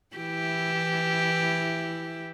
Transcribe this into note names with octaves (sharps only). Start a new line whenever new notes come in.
E3 E4 G4